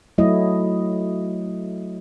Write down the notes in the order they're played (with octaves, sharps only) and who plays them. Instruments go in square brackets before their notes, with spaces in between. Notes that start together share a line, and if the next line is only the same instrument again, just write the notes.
[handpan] F#3 A3 E4 D#5